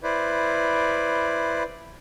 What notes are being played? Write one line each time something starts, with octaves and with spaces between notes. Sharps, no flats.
E4 B4 C5 D5